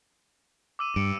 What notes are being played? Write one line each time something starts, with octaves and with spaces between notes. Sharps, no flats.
D6 E6 D#7
G2 C#7 D7